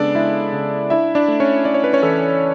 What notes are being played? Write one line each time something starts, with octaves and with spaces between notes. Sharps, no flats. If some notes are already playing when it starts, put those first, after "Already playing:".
Already playing: C#3 G#3 B3 D4 A4 D5
G#3 E4 E5
C#3
D4 E4 E5
D4 D5
A3
C#4 C#5
D4 D5
C#5
B4
C#4 C#5
E3 A4